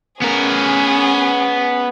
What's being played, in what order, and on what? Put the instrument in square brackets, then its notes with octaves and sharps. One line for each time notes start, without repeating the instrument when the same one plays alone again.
[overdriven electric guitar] B3 A#4 [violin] C#4 G#4